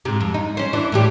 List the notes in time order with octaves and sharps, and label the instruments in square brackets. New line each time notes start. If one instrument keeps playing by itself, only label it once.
[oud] G#2 C3
F2
D#4
C4 C#4
E3 D4
A2 E3 G4